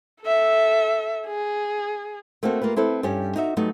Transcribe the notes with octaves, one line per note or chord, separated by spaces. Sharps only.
A4 E5
G#4
A3 A#3 C4 F#4 A4
A#3 F4 G4 B4
C4 E4 A4 B4
G2 G3 C#4 G4
D#4 F#4 E5
F#3 G3 A3 B3 D#4